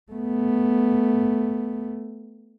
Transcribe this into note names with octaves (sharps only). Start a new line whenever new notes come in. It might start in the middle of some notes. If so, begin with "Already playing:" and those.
A3 B3